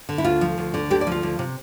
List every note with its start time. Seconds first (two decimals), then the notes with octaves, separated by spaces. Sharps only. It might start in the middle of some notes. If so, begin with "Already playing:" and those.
0.09 D3
0.18 E4
0.24 D2 F4
0.41 F3
0.58 D2
0.74 D3
0.90 D2 G4
1.01 D5
1.07 F3 F4
1.23 D2
1.39 C3